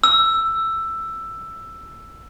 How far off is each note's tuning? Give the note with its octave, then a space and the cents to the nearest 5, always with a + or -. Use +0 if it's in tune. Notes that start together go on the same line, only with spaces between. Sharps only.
E6 +10